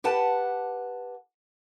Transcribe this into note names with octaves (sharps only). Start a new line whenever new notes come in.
G4 B4 F#5 A5